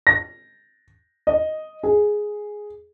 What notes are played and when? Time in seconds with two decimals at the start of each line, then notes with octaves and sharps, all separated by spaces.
0.07 A#6
1.27 D#5
1.83 G#4